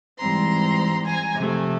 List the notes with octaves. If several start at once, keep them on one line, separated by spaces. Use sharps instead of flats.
G#2 E3 G3 C4 A#5 C6
G#5 A#5
C3 F3 A3